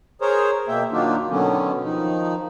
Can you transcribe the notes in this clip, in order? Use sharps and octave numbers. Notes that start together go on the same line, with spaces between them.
G#4 A#4 C5 C#5
B2 A#3 E5 G5
D#3 F#3 A#3 D4 D#4 F4
B2 D3 D#3 F#3 B3 C#4
D#3 F3 D#4